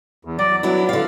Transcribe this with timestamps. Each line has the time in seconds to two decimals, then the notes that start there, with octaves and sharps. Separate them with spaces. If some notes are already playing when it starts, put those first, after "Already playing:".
0.25 E2
0.39 F#3 D5
0.63 F#3 B3 D4 E4
0.89 D3 F5